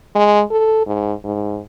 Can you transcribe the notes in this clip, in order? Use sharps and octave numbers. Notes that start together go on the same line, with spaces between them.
G#3
A4
G#2
G#2